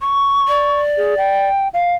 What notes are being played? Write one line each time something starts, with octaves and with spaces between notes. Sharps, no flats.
C#6
D5
G#4
G5
F5